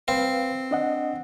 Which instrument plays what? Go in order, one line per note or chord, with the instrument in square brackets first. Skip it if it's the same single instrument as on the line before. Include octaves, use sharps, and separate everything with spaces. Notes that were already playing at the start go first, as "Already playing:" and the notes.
[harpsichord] C4 [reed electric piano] B4 F5
[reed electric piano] D4 D#5 F#5